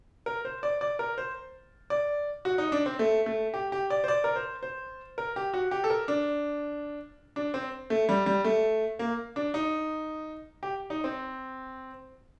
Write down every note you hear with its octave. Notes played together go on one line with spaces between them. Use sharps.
A#4
C5
D5
D5
A#4
C5
D5
F#4
D#4
D4
C4
A3
A3
G4
G4
D5
C5
D5
A#4
C5
C5
A#4
G4
F#4
G4
A4
A#4
D4
D4
C4
A3
G3
G3
A3
A#3
D4
D#4
G4
D#4
C4